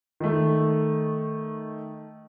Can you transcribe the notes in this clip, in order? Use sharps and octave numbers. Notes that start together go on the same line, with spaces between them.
D#3 A3